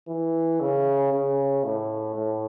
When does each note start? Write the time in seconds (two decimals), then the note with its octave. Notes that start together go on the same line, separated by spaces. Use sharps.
0.08 E3
0.61 C#3
1.12 C#3
1.64 A2
2.15 A2